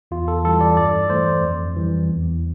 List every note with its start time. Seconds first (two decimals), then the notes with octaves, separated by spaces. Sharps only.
0.11 E2 F4
0.28 A4
0.44 E3 G3 A4
0.61 D5
0.77 G2 D5
1.10 E3 A3 C5
1.43 F2
1.76 E3 G3
2.09 E2